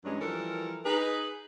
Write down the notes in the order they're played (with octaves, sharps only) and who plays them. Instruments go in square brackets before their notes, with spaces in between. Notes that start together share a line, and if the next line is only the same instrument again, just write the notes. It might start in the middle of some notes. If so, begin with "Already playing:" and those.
[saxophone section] G2 E3 F#3 G#3 C#4 D4
E3 F3 G3 A4 A#4
D#4 G#4 B4